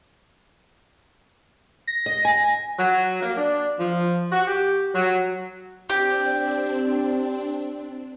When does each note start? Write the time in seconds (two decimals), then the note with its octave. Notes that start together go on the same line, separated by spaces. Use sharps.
1.87 A#6
2.06 D#5
2.25 G#5
2.79 F#3
3.22 A#3
3.38 D4
3.80 F3
4.32 F#4
4.48 G4
4.95 F#3
5.90 C4 D4 G4